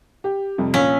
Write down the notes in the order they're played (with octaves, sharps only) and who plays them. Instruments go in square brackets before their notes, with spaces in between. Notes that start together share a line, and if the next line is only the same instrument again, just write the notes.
[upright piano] G4
F2 C3 G3
[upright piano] A#1 F5 B6 [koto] C#4